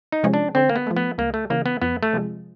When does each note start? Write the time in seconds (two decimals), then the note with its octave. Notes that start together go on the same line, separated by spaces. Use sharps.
0.12 D#4
0.23 C3 F3 G#3 C#4
0.34 D4
0.55 D3 C4
0.69 A#3
0.76 B3
0.87 F3 A3
0.96 B3
1.18 C#2 A#3
1.34 A3
1.50 C#3 E3 A#3
1.66 B3
1.81 F2 B3
2.03 A3
2.13 C3 F3 G#3